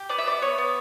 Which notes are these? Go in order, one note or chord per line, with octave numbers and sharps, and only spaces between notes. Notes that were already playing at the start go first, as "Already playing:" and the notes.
Already playing: G4
B3 D5
E5
B3 D5
B3 C#5
B3